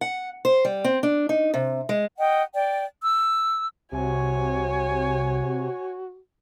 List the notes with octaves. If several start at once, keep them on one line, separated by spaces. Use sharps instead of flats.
F#5
C5
G3
C4
D4
D#4
C3
G#3
D#5 F#5 G5
D5 G5
E6
C2 C3 F#4 C#5 G#5